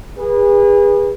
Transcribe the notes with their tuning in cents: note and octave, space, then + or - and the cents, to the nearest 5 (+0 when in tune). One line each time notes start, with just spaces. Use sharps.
G#4 -35 B4 -25